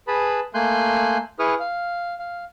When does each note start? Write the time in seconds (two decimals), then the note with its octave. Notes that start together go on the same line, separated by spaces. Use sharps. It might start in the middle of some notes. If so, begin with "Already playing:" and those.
0.08 G#4 B4 A5 B5
0.54 A3 A#3 G#5 C6 F#6 G6
1.39 E4 G#4 B4 C#6 D#6 F6
1.60 F5
2.19 F5